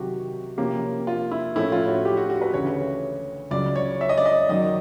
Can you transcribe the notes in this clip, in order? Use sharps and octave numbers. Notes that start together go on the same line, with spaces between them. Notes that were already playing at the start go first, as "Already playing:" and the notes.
Already playing: C3 D#3 F#3 F#4 G4
C3 F3 A#3 C#4 G4
F4
E4
A2 F3 A3 C#4 E4
F4
F#4
G4
F#4
F#4
B4
D2 C#3 E3 A3 C#4 C#5
C#2 C#3 F#3 D5
C#5
E5
D#5
D5
D#5
F#2 D#3 F#3 D#5